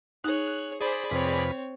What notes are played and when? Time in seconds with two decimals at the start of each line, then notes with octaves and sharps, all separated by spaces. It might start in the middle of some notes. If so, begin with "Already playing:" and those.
0.24 D#4 G#4 C#5 F#6
0.81 G#4 C5 D5 B5
1.11 F2 C3 C4 B4 C#5